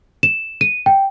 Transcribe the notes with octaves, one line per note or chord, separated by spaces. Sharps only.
E7
D#7
G5